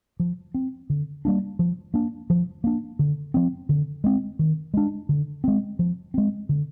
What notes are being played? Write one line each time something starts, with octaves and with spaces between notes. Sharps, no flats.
F3
C4
D3
G3 A#3 D4
F3
A#3 D4
F3
A#3 D4
D3
F3 C4
D3
G#3 C4
D#3
G#3 D4
D3
G#3 C4
F3
G#3 C4
D3